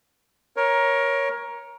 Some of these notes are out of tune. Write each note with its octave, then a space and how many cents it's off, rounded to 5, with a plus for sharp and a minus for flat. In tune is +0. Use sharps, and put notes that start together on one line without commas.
A#4 +20 C#5 +0